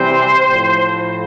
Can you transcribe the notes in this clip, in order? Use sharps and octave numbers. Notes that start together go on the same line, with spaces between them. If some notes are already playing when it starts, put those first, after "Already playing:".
Already playing: C3 E3 G3 C5
A2 F3